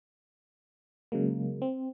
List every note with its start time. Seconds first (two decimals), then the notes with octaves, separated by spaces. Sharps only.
1.12 C#3 F#3 G#3 A#3
1.62 C4